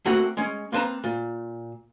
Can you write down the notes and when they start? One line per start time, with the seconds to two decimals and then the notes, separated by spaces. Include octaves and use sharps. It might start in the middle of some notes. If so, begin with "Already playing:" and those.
0.06 A3 A#3 C4 F#4 F#5
0.37 G#3 C#4
0.72 A#3 C4 B4 A5 A#5
1.04 A#2